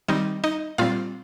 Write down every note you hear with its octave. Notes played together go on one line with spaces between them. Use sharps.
D#3 G3 C4 D#4 D#5
D#4 D#5
A#2 G3 C4 F4 F5